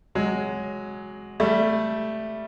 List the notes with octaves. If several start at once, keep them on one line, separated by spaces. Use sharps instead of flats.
F#3 G#3
G3 A3